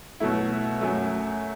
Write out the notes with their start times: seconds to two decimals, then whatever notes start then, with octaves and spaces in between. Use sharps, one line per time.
0.20 B2 F#3 A3 E4
0.81 F#2 F#3 A3